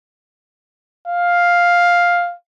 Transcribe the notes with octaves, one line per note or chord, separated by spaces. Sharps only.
F5